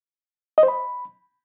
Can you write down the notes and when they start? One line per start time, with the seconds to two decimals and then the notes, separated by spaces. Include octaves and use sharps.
0.58 D#5
0.63 C5
0.68 B5